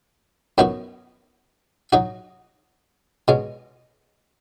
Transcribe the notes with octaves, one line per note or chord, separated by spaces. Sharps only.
F#2 F#3 B3 D#4 F#4
F#3 D#4 F#4
B2 G#3 C#4